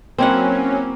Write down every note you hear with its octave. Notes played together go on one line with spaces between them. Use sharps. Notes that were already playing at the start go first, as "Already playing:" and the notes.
F#3 A#3 C4 C#4 E4 F#5